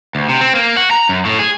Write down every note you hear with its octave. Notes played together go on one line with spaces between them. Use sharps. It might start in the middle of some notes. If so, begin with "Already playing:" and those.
D2
C3
C4
A#3
F#4
A#5
F#2
A2
G#4